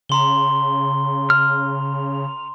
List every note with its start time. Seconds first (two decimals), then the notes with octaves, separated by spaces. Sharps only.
0.09 C#3 A#5 C6 G7
1.30 F6